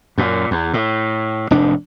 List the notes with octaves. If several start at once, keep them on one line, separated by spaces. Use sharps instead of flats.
F#2 A#2
E2
A2
F1 G#2 D4